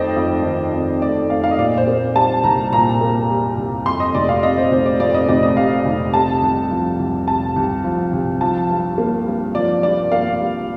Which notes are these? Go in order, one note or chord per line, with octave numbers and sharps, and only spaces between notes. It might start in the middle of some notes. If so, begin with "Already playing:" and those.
Already playing: F2 D#3 A3 C5 D5 D#5 G5
F2
D#3
F2
A3 D5
F2 F5
F5
D#5
A#2 D5
C5
A#3
G3 A5
C2 A#5
A#2 A#5
A#3
G3
C2
F2 C6
D#5
F1 D5
F5
C3 D#5
C5
F1 C5
D5
F2 D5
D#5
F1 D5
D#5
C3 F5
F1
C3 A5
C2
F3
C2
C3 A5
C2
F3
C2
F3 A5
G2
A#3
G2
F3 D5
G2 D5
A#3 F5
G2